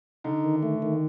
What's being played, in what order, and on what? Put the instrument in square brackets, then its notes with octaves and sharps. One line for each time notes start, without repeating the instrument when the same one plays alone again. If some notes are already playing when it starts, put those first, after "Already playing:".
[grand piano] D3 [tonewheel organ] D#4
[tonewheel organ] D#3
A3
D#3